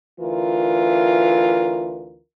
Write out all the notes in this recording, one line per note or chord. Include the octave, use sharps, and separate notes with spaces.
D2 E3 F4 A#4